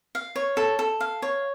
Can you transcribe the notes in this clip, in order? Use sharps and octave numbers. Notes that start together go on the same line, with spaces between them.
F5
C#5
A4
A4
F5
C#5